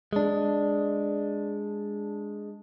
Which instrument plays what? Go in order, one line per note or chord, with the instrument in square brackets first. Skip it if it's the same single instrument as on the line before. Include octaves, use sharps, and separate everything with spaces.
[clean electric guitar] G#3 D4